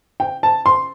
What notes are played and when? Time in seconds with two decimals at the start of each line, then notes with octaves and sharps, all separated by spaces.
0.20 G5
0.43 A5
0.66 C6